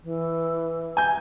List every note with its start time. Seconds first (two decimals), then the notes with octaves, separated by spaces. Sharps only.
0.03 E3
0.97 G#5 G6